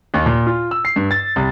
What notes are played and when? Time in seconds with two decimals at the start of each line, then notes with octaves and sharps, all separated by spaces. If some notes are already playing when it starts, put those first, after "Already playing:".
0.14 D#2
0.26 A#2
0.46 F4
0.71 E6
0.85 C7
0.96 G2
1.11 A6
1.36 C2